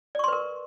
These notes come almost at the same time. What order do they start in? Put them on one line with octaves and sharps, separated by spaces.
D5 C#6 C6 B4 A#4